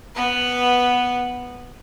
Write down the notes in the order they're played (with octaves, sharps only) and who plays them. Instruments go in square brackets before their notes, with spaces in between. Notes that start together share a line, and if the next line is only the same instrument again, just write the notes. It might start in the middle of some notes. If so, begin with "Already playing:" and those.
[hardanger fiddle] B3 B4